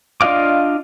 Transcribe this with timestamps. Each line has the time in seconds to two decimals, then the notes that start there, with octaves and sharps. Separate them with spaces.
0.21 D4 F4 D#5 F5 D6